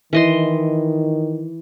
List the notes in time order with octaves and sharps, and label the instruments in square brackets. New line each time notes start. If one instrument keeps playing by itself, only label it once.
[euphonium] D#3 [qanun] E3 D#5 C6